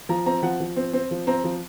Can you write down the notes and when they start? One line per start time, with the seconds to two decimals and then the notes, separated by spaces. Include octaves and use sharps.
0.09 F3 A#5
0.26 C4 A#5
0.43 F3 F#5
0.60 F3
0.76 C4
0.93 C4
1.11 F3
1.27 C4 A#5
1.44 F3